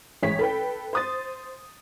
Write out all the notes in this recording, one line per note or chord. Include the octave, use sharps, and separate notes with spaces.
A1 G#3 C#5 B6
A4 B4 G5
C5 D#6 A6